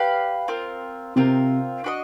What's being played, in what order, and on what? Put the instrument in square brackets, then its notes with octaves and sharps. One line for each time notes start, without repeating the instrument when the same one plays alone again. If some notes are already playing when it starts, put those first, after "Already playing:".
Already playing: [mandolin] G4 B4 D5 F5
C4 F4 A#4
[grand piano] C3 [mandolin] C4 F4 A#4
[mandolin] D4 F#4 B4 D#5